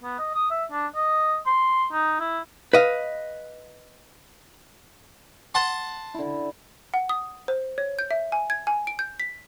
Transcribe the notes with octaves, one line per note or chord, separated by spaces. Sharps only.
B3
D#5
D#6
E5
D4
D#5
C6
D#4
E4
B4 D#5 F5
F#5 A5 C6
D3 E4
F#5
D#6
C5
C#5
G6
E5
G#5
G#6
G#5
D7
G6
B6